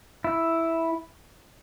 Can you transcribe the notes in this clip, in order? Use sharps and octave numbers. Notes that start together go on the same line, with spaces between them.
E4